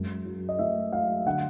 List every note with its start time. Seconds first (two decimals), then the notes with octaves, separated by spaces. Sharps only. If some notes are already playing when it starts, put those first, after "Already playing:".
Already playing: F#2 G#3
0.25 F#3
0.49 D#5
0.59 A3 E5
0.92 F#3 F5
1.26 D3 F#5